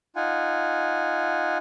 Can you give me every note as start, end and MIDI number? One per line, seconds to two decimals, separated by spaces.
0.16 1.58 63
0.16 1.58 65
0.16 1.58 78
0.16 1.58 80